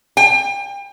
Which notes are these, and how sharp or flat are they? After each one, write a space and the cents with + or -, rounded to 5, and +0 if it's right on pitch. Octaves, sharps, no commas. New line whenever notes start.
G5 +35